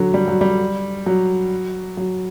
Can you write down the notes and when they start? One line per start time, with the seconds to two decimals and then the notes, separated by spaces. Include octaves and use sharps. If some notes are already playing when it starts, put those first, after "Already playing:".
Already playing: D3 F#3
0.14 G3
0.28 F#3
0.41 G3
1.06 F#3
1.97 F#3